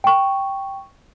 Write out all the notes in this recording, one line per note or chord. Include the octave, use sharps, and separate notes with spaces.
G5 C#6